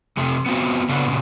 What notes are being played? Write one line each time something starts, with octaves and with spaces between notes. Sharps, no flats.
F2 C3 A3
B3 C4 F4 F#4
C#3 A3 B3 D4 F#4 B4
A#2 C#3